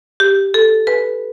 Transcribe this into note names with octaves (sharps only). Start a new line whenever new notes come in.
G4
A4
B4